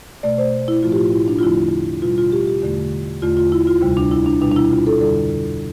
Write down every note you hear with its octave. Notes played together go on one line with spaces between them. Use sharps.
B2 A3 D5
C5
E4
A2 F3 A3 F4
G4
F4
E4
D4
F4
E2 D3 F3 A3 E4
B2 G3 F4
F4
G4
G4
E2 D3 A3
E2 D3 A3 F4
F4
E4
F4
D2 C3 G3
D4
E4
D4
B2 G3 D4
D4
E4
F4
A4
F2 D3 G3 A4